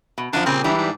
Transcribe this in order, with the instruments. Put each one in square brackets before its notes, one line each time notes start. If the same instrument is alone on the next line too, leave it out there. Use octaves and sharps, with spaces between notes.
[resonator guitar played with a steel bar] B2
[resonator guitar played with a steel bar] F#2 F3 [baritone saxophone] D4
[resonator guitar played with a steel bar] A#2 C#3 G3 [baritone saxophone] C4
[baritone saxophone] G#2 [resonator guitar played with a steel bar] E3 G3 D4
[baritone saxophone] G#2